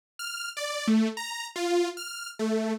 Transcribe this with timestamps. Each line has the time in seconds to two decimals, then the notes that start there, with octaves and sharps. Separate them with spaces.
0.19 F6
0.57 D5
0.87 A3
1.17 A#5
1.56 F4
1.97 F6
2.39 A3